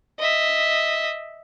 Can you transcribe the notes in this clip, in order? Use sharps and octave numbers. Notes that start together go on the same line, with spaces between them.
D#5 E5